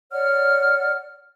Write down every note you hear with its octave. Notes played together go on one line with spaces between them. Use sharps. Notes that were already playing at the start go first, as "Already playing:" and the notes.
C#5 D5 F#5 F6